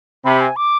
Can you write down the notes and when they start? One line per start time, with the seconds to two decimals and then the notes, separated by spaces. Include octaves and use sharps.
0.25 C3 B5
0.41 G#5
0.56 D6